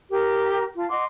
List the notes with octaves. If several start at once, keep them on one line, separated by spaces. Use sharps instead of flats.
G4 A#4
F4 A5
D#5 F#5 C6 D6